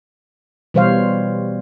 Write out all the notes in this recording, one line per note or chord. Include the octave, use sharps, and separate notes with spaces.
B2 E3 G3 C5 C#5 F5